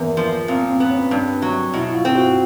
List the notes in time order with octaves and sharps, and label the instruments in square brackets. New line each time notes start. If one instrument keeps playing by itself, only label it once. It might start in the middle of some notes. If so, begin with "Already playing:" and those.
Already playing: [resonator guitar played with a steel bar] E2 [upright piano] A#3 B3
[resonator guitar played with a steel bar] F3
[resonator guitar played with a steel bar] A#2 [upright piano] C4
[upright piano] C4
[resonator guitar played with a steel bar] B3
[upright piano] C#4
[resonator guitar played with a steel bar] G2 [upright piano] D4
[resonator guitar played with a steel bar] F#3
[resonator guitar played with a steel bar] B2 [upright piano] E4
[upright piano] F4
[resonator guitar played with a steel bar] C4
[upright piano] F#4